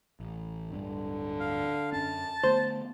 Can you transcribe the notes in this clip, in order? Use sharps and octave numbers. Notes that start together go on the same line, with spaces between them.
A1
D1 G2 D3 G3
F5
F#2 C#4 A5
D3 A3 B3 C5